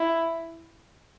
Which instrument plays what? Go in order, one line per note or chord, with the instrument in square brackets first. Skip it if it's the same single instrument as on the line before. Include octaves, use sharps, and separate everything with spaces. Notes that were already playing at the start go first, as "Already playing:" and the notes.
Already playing: [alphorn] E4